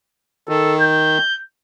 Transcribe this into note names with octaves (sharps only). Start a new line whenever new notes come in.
D#3 A4
G6